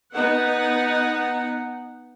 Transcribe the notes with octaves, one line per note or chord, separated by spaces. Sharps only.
B3 D#4 F#5